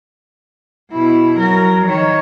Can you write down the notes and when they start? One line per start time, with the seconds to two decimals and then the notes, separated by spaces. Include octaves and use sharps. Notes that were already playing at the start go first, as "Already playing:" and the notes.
0.91 B2 E4
1.38 F#3 A#4
1.86 D#3 C#5